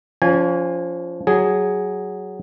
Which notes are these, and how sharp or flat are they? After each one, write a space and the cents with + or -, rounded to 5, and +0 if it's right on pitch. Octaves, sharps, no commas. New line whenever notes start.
F3 +0 C#4 +35 G#5 -20
F#3 +10 G#4 +0